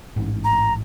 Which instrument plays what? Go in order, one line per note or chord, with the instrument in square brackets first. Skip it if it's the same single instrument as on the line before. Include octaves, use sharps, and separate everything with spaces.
[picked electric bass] A1 G#2
[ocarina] A#5